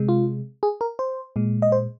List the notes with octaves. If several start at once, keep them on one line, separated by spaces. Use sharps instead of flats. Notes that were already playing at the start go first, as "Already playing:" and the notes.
Already playing: C3 G#3
F4
G#4
A#4
C5
A#2 G#3
D#5
C5